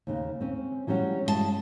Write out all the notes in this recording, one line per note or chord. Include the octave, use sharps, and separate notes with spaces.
D#2 C#3 D#4
C4 C#4
E3 F#3 G3 C#4 F#4
G2 G#3 E4 G#4 A5